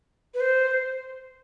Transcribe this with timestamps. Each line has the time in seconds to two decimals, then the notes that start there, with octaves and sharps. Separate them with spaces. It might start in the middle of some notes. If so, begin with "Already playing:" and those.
0.34 B4
0.40 C5